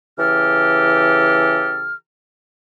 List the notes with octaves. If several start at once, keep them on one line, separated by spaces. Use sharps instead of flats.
C#3 E3 G4 A4 F6